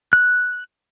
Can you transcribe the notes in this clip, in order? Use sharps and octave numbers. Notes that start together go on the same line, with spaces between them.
F#6